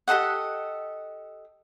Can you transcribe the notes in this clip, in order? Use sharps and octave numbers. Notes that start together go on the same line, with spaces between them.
G4 A4 D#5 F#5